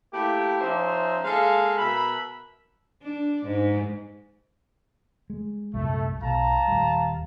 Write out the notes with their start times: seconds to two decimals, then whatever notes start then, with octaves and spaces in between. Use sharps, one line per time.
0.13 A3 A#3 E4 G4
0.61 F3 C#4 D#4 C5 E5
1.24 G#3 A#3 A4 F5
1.78 B2 A#4 E5 B5
3.03 D4
3.45 G#2
5.30 G#3
5.74 C2 F#2 A#2 A3
6.22 B1 F5 A5 A#5
6.68 D#1 G3